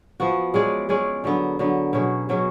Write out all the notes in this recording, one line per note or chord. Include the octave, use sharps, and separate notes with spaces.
F3 B3 F#4
G#3 C#4 G#4 D5
G#3 C#4 G#4 D5
D3 F#3 B3
D3 F#3 B3
B2 F#3 C#4 G#4
B2 F#3 C#4 G#4